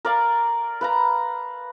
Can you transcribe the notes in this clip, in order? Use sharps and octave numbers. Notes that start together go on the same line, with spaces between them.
A#4 D5 F5
B4 F5 A#5